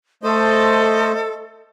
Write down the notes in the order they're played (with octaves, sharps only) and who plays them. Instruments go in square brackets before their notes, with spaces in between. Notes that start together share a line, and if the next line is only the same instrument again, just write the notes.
[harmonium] A3 C5 D#5 [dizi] A4